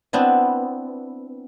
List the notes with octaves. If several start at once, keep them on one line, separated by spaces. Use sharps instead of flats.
B3 C4 D4 E4